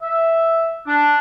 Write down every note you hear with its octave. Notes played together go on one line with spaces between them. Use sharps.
E5
D4